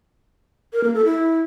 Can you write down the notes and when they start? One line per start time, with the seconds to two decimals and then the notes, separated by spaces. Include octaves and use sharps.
0.73 A#4
0.84 A#3
0.94 A4
1.05 E4